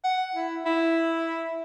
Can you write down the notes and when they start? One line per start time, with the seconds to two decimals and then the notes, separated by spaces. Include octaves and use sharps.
0.04 F#5
0.35 E4
0.66 E4